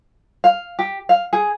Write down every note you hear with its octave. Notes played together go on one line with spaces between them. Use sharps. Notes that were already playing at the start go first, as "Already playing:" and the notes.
F5
G4
F5
G#4